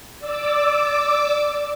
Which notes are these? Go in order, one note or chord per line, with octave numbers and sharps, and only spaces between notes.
D5 D6 E6